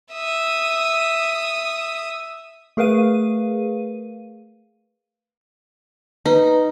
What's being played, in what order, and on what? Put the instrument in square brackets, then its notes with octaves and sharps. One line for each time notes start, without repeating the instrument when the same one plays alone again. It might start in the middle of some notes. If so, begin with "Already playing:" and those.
[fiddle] E5 D#6
[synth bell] A3 G#4 A#4 B4 F5 D#7
[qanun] D#4 [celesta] B4